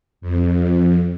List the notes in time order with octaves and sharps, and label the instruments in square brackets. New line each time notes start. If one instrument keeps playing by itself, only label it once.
[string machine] F2